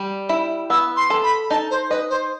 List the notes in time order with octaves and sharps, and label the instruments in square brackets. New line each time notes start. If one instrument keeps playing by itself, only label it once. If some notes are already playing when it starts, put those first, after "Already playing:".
Already playing: [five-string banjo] G3
E4
[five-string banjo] B3 [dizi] E6
[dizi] C6
[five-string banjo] A4
[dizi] B5
[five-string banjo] D#4 [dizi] A5
[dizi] C5
[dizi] B4 [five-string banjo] D#5
[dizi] C5